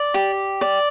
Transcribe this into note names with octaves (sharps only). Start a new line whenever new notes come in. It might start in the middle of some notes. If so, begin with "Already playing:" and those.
Already playing: D5
G4
D5